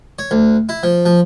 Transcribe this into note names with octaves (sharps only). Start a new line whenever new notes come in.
C#5
D2
E4
F3
F3